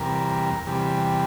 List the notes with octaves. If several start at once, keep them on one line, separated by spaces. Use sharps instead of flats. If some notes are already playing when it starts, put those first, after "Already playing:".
Already playing: E2 C3 G3 A#4
E2 C3 G3